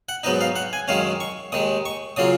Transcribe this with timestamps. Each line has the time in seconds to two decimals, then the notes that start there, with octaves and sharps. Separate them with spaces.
0.09 F#5
0.23 G#2 F#3 B3 D#4 D#5
0.41 F5
0.56 F#5
0.73 G#5
0.88 F#2 D#3 G#3 C#4 F5
1.20 C#6
1.52 D#2 D#3 G#3 D#6
1.86 C#6
2.16 C#3 F#3 A#3 F4 D#6